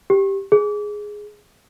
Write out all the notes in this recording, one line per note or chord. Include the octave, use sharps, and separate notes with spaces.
G4
G#4